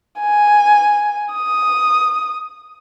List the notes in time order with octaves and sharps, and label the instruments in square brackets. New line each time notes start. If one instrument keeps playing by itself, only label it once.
[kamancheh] G#5
D#6